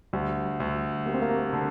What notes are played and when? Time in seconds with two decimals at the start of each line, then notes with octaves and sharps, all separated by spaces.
0.13 D2 G3
0.60 D2
1.06 G3 A#3
1.14 C4
1.22 A#3
1.53 D3